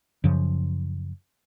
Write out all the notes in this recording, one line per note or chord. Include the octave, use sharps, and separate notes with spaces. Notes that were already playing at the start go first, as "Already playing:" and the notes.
F#2 C#3 F3